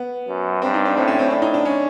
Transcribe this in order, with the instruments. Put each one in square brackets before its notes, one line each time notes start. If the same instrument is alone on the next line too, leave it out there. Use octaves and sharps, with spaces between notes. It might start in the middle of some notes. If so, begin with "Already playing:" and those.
Already playing: [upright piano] B3
[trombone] F#2
[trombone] G2 [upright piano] C4
[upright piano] D#4
D4
[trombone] A2 [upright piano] C4
[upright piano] C#4
C4
[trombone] A2 [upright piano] D4
[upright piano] D#4
D4
C#4